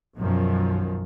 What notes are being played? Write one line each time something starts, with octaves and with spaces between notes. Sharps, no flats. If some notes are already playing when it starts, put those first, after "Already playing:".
B1 F#2 D#3 F3